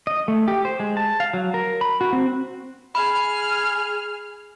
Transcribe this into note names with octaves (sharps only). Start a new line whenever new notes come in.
D#5
A3
G4
C5
G#3
A5
F5
F#3
A#4
B5
F#4
C4
G#4 B5 F6